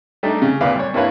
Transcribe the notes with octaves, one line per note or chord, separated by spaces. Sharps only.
G3 A3 D4 D#4
C#3
G#1 D2 A#2 B4 F5
G3 C#5
G2 A#3 E4 B4 C#5 F5